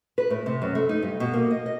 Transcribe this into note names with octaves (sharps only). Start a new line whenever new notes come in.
B4
A2
C3
F#2
A3
D#4
G2
B2
A#3
D#5
D#5